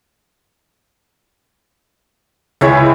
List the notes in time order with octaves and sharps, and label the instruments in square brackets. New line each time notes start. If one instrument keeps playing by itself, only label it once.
[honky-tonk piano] C#2 C#5 [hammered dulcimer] E3 E4 B5